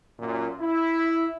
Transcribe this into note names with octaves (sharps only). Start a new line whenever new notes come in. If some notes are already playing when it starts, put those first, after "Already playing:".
F#2 A#2
E4